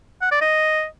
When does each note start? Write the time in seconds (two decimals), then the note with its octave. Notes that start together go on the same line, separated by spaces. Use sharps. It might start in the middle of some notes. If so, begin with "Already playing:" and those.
0.22 F#5
0.31 D5
0.41 D#5